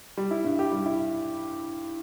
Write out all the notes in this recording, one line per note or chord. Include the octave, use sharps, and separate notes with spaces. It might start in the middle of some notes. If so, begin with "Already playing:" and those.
G3
E4
G2
G4
G3
E4